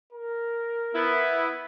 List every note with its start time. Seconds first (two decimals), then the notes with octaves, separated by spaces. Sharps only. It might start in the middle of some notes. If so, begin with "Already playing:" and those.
0.13 A#4
0.95 B3 E4